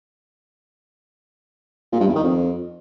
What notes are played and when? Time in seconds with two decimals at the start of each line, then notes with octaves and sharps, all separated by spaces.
1.92 A#2
2.00 G2
2.07 E2
2.15 D#3
2.23 F2